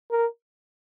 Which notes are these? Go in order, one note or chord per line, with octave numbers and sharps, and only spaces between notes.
A#4